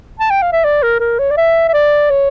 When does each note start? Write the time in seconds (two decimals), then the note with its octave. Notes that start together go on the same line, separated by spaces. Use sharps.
0.20 A5
0.30 G5
0.42 F5
0.52 E5
0.64 D5
0.83 A#4
1.00 A#4
1.19 C#5
1.31 D5
1.37 E5
1.68 E5
1.73 D5
2.10 C#5